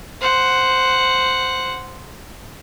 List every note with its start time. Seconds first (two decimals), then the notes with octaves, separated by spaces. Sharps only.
0.21 C5 F#5